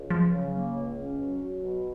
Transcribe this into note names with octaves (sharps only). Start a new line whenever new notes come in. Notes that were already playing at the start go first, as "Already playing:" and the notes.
Already playing: C#2
F3 F#3
C#3
A#3
C#2
C#4
F#3
F#4
B2